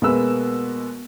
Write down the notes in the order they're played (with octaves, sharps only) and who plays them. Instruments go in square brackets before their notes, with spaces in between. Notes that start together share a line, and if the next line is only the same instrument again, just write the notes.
[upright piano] B2 G#3 A#3 B4 E6